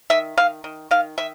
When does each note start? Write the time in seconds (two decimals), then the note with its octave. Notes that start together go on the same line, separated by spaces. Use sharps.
0.10 D#3 E5
0.38 D#3 F5
0.64 D#3
0.91 D#3 F5
1.18 D#3 E5